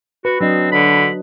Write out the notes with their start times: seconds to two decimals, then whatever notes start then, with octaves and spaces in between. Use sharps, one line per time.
0.25 F#4 B4
0.41 F#3 C4 D4 D#5
0.72 D3 B5